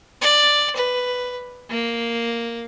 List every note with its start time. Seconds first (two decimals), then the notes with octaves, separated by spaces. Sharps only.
0.21 D5
0.76 B4
1.70 A#3